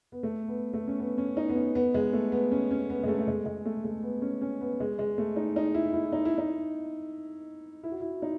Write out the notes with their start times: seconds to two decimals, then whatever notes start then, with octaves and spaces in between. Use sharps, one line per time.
0.12 B3
0.23 A3
0.48 B3
0.74 A3
0.88 C#4
0.99 B3
1.18 C#4
1.37 D#4
1.49 B3
1.56 C#4
1.75 B3
1.94 G#3
2.13 A3
2.32 B3
2.52 C#4
2.71 C#4
2.90 B3
3.03 G#3
3.08 A3
3.19 A3
3.27 G#3
3.46 G#3
3.66 A3
3.85 A3
4.03 B3
4.22 C#4
4.42 C#4
4.61 B3
4.80 G#3
4.99 G#3
5.18 A3
5.36 D#4
5.56 D#4
5.74 E4
5.93 E4
6.12 D#4
6.25 E4
6.38 D#4
7.83 E4
7.92 F#4
8.00 E4
8.22 D#4